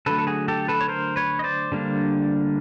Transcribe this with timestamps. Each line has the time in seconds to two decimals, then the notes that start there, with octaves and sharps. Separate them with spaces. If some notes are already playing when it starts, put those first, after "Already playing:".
0.06 D3 F#3 A3 A4 B4
0.18 A4
0.27 F#4 G#4
0.48 G4 A4
0.68 A4 B4
0.81 C#5
0.89 A#4 C5
1.16 B4 C#5
1.39 D#5
1.44 C5 D5
1.72 D3 G3 A#3 D4